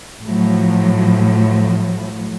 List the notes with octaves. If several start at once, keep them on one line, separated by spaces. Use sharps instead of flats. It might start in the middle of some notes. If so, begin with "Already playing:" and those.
A2 F3 F#3